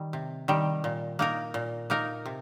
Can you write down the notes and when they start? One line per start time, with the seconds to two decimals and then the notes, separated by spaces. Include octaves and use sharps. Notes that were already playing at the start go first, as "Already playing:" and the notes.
Already playing: D#3 G3
0.13 C3
0.48 D#3 G3
0.84 A#2
1.19 A#3 D#4 A#4
1.54 A#2
1.90 A#3 D#4 A#4
2.26 C3